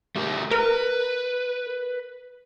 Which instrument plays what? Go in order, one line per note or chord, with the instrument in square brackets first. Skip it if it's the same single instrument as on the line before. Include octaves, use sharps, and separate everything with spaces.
[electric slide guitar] A3 G4 A#4
[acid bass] A#4 [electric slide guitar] B4